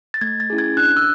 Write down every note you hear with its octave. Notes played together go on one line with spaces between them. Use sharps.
A6
A3 G#6
A6
C#4 E4 G#4
G#6
D4 F#6
E6